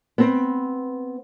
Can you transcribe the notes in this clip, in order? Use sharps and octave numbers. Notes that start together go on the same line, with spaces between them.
B3 C4